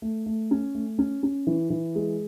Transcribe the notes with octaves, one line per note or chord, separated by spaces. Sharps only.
A3
A3
C#4
A3
C#4
C#4
E3
E3
G#3